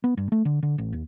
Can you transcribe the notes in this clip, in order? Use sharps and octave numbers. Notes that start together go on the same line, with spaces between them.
B3
G2
A3
D3
D3
A1
D#2